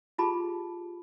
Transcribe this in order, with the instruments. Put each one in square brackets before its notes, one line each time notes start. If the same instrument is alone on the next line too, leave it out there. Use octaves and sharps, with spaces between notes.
[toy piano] F4 G4 G#4 A5 B5